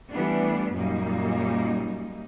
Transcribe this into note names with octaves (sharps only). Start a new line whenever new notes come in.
E3 G3 A3 B3 D4
F#2 A#2 G3 A#3 D#4